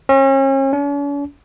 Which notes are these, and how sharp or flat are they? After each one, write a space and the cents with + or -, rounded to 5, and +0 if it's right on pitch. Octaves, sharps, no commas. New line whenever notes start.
C#4 -40
C#4 +45